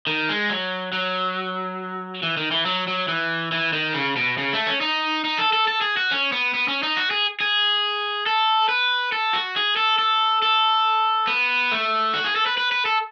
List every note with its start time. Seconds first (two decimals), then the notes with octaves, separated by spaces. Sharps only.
0.07 D#3
0.29 G#3
0.50 F#3
0.93 F#3
2.23 E3
2.37 D#3
2.51 E3
2.66 F#3
2.88 F#3
3.08 E3
3.52 E3
3.73 D#3
3.94 C#3
4.16 B2
4.38 C#3
4.53 A3
4.66 C#4
4.81 D#4
5.25 D#4
5.38 A4
5.53 A4
5.68 A4
5.81 G#4
5.97 F#4
6.11 C#4
6.32 B3
6.54 B3
6.68 C#4
6.83 D#4
6.97 F#4
7.11 G#4
7.40 G#4
8.26 A4
8.69 B4
9.12 A4
9.33 F#4
9.56 G#4
9.76 A4
9.99 A4
10.42 A4
11.27 B3
11.72 A3
12.14 F#4
12.24 G#4
12.36 A4
12.46 B4
12.57 B4
12.72 B4
12.85 A4